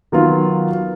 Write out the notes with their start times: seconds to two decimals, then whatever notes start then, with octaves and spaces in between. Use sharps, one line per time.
0.12 D#3 F#3 B3 F4